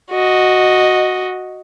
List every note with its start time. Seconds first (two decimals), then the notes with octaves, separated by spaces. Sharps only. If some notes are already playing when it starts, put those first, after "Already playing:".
0.11 F#4 D#5